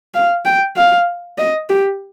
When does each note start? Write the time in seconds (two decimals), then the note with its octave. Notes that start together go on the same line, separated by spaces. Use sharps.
0.14 F5
0.45 G5
0.77 F5
1.38 D#5
1.70 G4